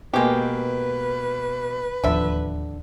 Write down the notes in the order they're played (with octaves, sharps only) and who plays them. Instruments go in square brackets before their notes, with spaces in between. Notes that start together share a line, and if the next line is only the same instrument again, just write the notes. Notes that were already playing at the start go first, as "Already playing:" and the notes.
[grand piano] B2 A#3 [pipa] G#3 G4 [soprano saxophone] B4
[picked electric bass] D1 D#2 F3 [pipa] D3 E5